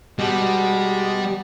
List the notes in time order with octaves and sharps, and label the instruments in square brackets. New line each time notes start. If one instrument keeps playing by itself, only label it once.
[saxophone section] B2 G#3 [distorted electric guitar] G3